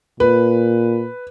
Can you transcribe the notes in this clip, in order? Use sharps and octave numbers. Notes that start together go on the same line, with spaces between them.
A#2 B4